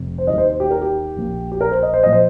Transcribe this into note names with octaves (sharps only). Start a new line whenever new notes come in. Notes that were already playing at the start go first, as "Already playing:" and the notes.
Already playing: F1
C5
D#2 D#3 G3 A#3 D#5
C5
C5
G4
A#4
G4
A#1 A#2 A#3
G4
A#4
C5
D#5
C5
A#2 F3 A#3 D#5
C5